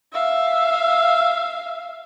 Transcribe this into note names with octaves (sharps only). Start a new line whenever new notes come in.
E5 F5